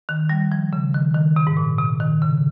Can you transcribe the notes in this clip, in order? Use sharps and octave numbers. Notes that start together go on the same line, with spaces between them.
D#3
G3
F3
C#3
D#3
D#3
C3
G#2
A#2
C3
D#3
C#3